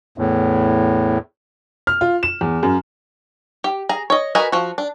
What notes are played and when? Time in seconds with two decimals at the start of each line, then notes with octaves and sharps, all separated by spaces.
0.18 E2 A2
1.87 F6
2.01 F4
2.23 E7
2.41 E2
2.63 F#2
3.64 G4
3.89 G#4 A#5
4.10 C#5 D#5
4.35 F#4 A#4 B4 D#5 G#5
4.52 F3 F#4
4.78 D4